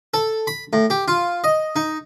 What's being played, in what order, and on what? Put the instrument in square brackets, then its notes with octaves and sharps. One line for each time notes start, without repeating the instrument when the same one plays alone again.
[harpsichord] A4
B5
A2
G4
F4
D#5
D#4